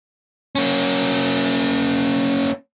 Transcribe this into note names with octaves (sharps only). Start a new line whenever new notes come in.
A#3 C#4